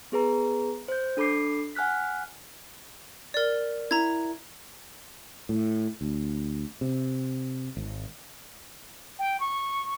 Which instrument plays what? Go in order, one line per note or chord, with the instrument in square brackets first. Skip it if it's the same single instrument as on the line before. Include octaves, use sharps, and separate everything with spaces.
[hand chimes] B3 G#4 B4 A#5
C5 G6
D4 A4 B5 D6 C7
F#5 G#5 F6 F#6 B6
[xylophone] A#4 D5
[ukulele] E4 [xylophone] A#5 G#6
[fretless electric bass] A2
D2
C3
G#1
[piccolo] G5
C#6